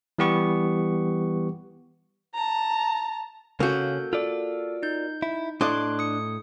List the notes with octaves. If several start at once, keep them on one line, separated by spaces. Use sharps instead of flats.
E3 G3 B3 G4 C#6
A5 A#5
C#3 A#3 C#4 F#4 A4 G6
F4 A4 D5
D#4 G6
E4
A2 D4 D#5 C6 D6 F#6
D#6 C#7